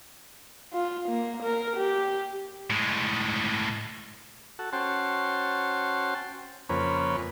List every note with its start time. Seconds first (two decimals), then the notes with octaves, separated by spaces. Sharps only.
0.74 F4
1.09 A#3
1.43 A#4
1.77 G4
2.70 A2 G#3
4.59 F#4 A4
4.73 C#4 F#4 C5 G5 A5 C6
6.69 F2 C#3 A#3 C4 B4 C#5